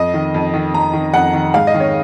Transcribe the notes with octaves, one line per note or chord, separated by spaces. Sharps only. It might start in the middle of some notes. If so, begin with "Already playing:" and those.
Already playing: F2 D#5
D#3
F2
D#3
F2 A#5
D#3
F2 F#5
D#3
G#2 F5
D#5
D#3
C#5